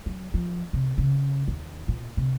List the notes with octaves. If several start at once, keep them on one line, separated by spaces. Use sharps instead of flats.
F#3
F3
C3
C#3
D#2
A#2
C3